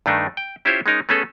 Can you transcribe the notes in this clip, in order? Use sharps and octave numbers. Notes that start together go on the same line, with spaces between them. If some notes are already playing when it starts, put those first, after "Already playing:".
G2 D#3 A3 D4 D#4
G5
C#4 E4 F4 G4 C5 C#5
G#3 C#4 D#4 A#4
A3 B3 C#4 G#4 A4